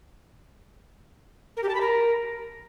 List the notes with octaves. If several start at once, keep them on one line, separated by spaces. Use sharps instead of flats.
A#4
G4
A5
B5
A#4